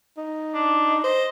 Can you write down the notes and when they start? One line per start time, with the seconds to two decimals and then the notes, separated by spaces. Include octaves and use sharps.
0.17 D#4
0.54 D4
1.04 C5 D#5